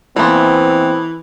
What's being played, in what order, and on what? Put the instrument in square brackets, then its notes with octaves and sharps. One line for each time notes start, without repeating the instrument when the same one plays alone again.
[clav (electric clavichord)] E2 A#2 [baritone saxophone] E3 [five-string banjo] A3 B3 [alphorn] C4